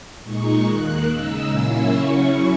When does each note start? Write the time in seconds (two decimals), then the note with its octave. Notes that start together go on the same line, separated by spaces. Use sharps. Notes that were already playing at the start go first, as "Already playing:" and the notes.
0.23 A#2 G#3 D#4 C#6
0.65 D#2 D#3 A#3 F#6
1.07 C#3 G#3 D#4 E6
1.49 A#2 F#3 A#3 C#4 E4
1.90 C#3 F#3 C#4 E4 C#6